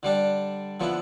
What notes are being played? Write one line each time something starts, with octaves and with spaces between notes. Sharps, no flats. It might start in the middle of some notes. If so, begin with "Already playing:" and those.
D3 G3 D4
D3 F3 B3 E4